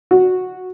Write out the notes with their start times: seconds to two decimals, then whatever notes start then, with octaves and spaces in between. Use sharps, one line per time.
0.11 F#4